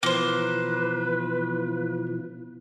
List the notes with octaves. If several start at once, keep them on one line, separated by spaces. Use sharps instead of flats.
B2 E3 F3 A#3 B4 C5